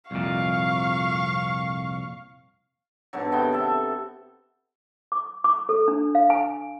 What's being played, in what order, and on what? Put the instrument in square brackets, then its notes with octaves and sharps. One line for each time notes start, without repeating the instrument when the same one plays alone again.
[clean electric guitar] C2 F2 A#2 [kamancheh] F5 C#6
[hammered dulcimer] G#2 B2 D3 F#3
C3 D#3 B3 G5
A4 E5
[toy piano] D6
D6
A4
D4
F5
G#5